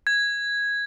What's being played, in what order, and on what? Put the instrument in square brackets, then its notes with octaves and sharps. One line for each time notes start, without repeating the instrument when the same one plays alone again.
[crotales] G#6